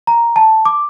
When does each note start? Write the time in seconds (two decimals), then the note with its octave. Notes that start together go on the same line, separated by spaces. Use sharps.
0.07 A#5
0.36 A5
0.65 D6